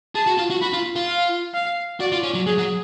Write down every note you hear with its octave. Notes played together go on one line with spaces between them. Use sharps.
G#4 A5
F#4
F4
F#4
F#4 B5
F4
F4
F5
F5
F#4 D5
F4
C#4
F#3
F#3 G#4
F#3